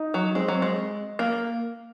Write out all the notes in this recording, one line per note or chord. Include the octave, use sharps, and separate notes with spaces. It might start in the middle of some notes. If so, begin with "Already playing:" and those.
Already playing: D#4
F#3
G#3 C4
F#3
C4
G#3
A#3